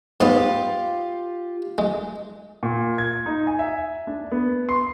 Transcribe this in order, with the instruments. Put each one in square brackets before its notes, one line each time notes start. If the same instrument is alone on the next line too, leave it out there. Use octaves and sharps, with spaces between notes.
[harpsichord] G#2 B3 [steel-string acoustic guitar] F4 G4
[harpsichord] G#3
[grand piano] A#2
G#6
D#4
G#5
E5
D4
B3
C6